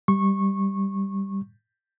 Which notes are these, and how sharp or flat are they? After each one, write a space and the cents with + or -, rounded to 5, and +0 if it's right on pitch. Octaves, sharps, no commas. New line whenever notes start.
G3 +0 C#6 -20